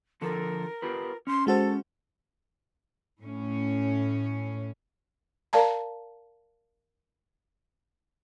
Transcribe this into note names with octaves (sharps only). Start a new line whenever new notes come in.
D3 F3 A4 A#4
F4 G4 B4
C#4 C6
G#3 F#4 A4 C5
A2 C#4
A#4 D5 F5 A5 A#5